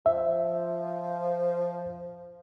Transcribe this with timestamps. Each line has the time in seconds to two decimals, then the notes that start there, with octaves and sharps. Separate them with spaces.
0.06 F3 E5